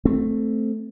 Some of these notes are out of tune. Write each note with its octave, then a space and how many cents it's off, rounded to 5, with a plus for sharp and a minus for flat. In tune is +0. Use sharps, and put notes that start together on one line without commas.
A3 +0 C4 +0